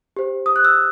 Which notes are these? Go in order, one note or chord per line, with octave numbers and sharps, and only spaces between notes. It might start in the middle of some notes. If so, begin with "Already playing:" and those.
G4 C5
D#6
F#6
E6